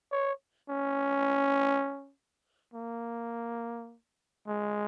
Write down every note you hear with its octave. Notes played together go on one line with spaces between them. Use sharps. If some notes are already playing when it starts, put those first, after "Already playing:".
C#5
C#4
A#3
G#3